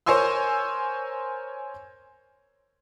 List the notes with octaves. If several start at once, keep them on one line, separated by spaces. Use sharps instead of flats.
A#4 C5 C#5 G#5 C6 E6